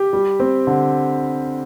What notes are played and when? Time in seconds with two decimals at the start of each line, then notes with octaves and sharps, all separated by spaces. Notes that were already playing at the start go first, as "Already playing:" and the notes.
Already playing: G4
0.13 G3
0.40 C4
0.67 D3